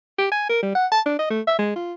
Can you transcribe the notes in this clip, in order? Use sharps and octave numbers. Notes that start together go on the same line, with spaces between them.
G4
G#5
A#4
G3
F#5
A5
D4
D#5
A3
E5
G#3
F4